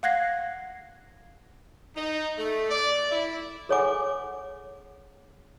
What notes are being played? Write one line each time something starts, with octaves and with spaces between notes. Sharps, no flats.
F5 F#5 F#6 G#6 A#6 C7
D#4
A3
D5
E4
G#4 A4 C#5 F#5 G#5 D6